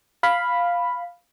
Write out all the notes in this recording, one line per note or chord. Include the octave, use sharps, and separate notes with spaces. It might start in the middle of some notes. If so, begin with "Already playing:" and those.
F5 B5